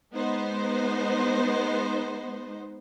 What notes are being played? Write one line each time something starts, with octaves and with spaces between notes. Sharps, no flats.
G#3 B3 D#4 C5